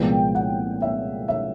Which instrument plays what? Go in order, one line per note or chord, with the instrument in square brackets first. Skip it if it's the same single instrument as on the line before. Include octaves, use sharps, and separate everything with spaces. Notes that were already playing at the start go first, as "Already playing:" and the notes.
Already playing: [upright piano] C2 A#2 F3 G#3 B3 G5
F#5
E5
E5